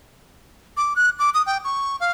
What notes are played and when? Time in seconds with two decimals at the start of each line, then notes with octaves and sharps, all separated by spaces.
0.77 D6
0.96 F#6
1.19 D6
1.34 D#6
1.46 G5
1.65 C#6
2.00 F5